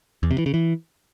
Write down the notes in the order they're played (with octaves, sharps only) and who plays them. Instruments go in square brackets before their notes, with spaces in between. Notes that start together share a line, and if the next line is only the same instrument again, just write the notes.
[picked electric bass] E2
C3
E3
C#3
E3